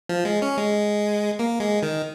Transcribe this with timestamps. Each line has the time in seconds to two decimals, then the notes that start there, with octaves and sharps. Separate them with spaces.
0.09 F3
0.25 G#3
0.42 C#4
0.57 G#3
1.39 A#3
1.60 G#3
1.83 D#3